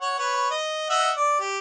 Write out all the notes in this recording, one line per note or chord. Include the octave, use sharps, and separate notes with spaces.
C#5 F#5
B4 C#5
D#5
D#5 E5 F#5
D5
G4